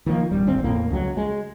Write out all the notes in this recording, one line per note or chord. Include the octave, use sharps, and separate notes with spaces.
D#3 F3 A#3
D1 G3
D1 G#1 D2 C4
E2 A2 A#3
C#2 F#3
G#3